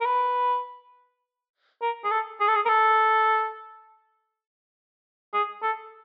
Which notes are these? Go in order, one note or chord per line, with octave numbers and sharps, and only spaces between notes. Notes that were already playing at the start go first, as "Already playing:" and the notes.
A#4
B4
A#4
G#4
A4
G#4
A4
G#4
A#4
A4
G#4
A4